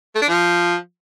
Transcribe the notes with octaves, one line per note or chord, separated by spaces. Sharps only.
A3
D4
F3